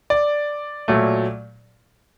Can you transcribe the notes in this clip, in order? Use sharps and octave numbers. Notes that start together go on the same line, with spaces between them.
D5
A#2 F#3 A3